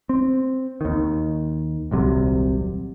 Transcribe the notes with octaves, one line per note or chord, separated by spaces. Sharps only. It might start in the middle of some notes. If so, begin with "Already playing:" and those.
C4
D#2 D#3
D#1 C2 C3 F#3